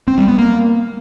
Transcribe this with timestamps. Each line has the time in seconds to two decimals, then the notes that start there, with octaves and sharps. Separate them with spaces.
0.08 C4
0.18 G3
0.28 B3
0.38 A#3